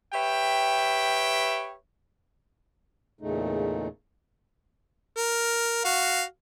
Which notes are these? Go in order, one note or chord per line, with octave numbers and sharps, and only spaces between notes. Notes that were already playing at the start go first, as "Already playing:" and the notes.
G4 B4 C#5 E5 G5
E2 A#2 C#3 A3 D#4
A#4
F#4 F5